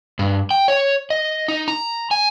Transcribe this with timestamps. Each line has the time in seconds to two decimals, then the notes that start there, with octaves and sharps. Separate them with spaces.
0.19 G2
0.51 G5
0.68 C#5
1.10 D#5
1.48 D#4
1.68 A#5
2.11 G#5